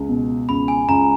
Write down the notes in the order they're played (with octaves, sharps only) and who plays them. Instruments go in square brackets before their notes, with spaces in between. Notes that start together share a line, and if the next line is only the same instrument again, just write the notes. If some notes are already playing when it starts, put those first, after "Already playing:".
Already playing: [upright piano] C#2
B2
[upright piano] C#2 [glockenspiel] B5
[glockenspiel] G#5
[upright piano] C#2 [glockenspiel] A#5